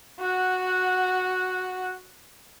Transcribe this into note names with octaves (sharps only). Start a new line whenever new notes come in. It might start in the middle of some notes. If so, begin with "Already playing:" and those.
F#4 F#5